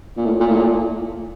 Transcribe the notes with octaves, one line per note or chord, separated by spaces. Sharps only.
A#2
A2
A#2
A2
A#2